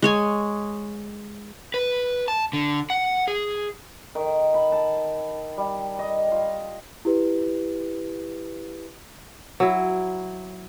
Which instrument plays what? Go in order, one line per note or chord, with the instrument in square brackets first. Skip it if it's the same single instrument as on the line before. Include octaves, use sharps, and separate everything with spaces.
[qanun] G#3 C#5 G#5
[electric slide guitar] B4
A5
D3
F#5
G#4
[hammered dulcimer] D#3
B5
A5
G3
D#5
F4
[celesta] E4 G4 B4
[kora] F#3 E4